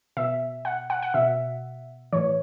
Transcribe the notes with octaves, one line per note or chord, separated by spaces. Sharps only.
B2 E5
F#5
F#5
F#5
B2 E5
A2 E3 C#5